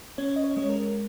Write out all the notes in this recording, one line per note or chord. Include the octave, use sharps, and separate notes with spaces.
C#4 C#5
D#5
C#5
G#3 C#5
A#4